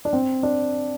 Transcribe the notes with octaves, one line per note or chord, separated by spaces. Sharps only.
D4
C4
D4